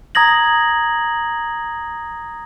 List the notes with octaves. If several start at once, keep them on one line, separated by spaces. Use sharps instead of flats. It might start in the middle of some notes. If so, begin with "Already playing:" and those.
A#5 D#6 G#6 A#6 F#7